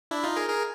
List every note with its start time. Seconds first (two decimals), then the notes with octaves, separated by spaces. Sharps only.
0.11 D4 E4
0.23 D#4 F4
0.36 G#4 A#4
0.49 G#4 A#4